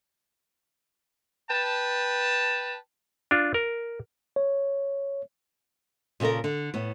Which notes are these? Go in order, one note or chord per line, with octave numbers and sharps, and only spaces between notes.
B4 G5 A5
D4 F4
A#4
C#5
A#2 C#3 E4 A4 A#4
D3
A2 B3